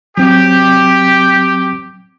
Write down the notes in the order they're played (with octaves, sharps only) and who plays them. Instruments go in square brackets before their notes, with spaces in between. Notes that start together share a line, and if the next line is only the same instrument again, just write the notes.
[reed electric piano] F#3 C4 [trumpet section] G4